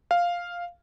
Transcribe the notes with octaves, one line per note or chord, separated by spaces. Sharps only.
F5